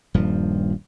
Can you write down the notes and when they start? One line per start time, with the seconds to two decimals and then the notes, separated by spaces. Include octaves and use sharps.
0.14 D#1 G2 F3